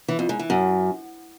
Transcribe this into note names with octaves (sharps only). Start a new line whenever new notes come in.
E3
F2
G#2
E3
F#2